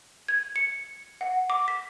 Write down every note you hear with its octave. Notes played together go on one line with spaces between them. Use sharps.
G#6
C#7
F#5
D6
B6